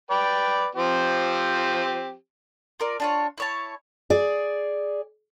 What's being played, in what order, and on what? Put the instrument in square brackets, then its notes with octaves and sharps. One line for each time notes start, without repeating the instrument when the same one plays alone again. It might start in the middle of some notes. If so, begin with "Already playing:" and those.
[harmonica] B4 D5 G5
F3 C4 G4
[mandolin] F4 A#4 D5
D4 F4 C#5
E4 C#5 A5
[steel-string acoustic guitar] G#4 D5